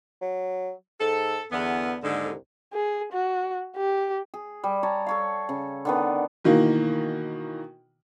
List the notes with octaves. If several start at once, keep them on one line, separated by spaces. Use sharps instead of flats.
F#3
G#2 A4
E2 D3 B3
D#2 G#2 D3
C2
G#4
F#4
G4
G#4
G3
C#5 A5 A#5
A4 C#5 F5
C#3
D3 D#3 B3
B2 D#3 E3 A#3